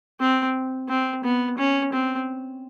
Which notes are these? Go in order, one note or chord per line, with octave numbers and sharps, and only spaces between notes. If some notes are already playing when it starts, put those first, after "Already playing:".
C4
C4
B3
C#4
C4